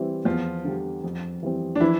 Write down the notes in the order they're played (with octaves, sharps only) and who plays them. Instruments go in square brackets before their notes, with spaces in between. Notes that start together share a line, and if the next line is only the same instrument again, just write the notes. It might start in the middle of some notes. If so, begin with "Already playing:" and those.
Already playing: [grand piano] E3 G3 C4 E4
[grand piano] E2 [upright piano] F3 F4
[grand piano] D3 G3
F2
E3 G3 C4
[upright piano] D4
[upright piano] E3 E4 [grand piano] F3